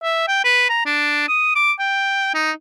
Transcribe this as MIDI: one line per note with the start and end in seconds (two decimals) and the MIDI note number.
0.03 0.24 76
0.28 0.41 79
0.44 0.66 71
0.69 0.85 82
0.86 1.25 62
1.29 1.53 87
1.56 1.72 86
1.79 2.30 79
2.34 2.52 63